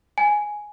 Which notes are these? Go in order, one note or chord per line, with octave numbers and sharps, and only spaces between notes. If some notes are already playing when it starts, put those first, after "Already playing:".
G#5